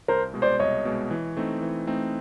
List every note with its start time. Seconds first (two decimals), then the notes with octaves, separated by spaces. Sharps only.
0.08 C2 A#4 C5
0.34 B2 G#3
0.42 C5 D5
0.60 C2 C#5 D#5
0.85 B2 G#3
1.11 E3
1.37 A3 C4 D#4
1.62 E3
1.87 A3 C4 D#4